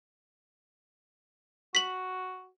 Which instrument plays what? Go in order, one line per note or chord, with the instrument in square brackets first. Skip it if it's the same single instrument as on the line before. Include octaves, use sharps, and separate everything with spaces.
[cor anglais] F#4 [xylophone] B6 F#7